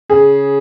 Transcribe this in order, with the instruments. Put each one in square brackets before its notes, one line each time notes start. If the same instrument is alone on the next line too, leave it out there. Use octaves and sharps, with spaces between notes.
[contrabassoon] C#3 [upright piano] G#4